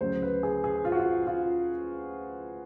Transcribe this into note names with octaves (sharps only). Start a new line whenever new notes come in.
D2 C#3 F#3 C5
B4
G#4
G#4
F4
F#4
F4
F4